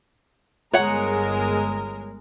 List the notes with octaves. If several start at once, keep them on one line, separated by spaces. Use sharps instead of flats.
G1 G#3 A#4 C#5 F#5